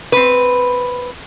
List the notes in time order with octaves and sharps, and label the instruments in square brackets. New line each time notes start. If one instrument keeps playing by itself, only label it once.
[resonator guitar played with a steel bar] C4 B4